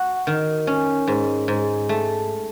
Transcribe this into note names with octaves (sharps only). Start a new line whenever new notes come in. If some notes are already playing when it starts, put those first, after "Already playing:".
Already playing: F#4
D#3
C#4
G#2
G#2
A3